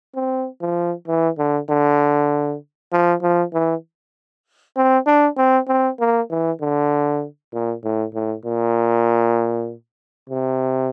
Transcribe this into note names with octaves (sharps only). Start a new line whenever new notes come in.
C4
F3
E3
D3
D3
F3
F3
E3
C4
D4
C4
C4
A#3
E3
D3
A#2
A2
A2
A#2
C3